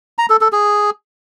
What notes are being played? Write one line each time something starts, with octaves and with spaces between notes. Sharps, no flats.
A#5
A4
A4
G#4